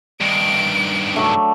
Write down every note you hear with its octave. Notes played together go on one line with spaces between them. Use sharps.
G2 D#3 D7
F#3 A3 D4